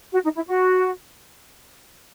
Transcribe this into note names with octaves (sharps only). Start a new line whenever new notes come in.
F#4
D#4
E4
F#4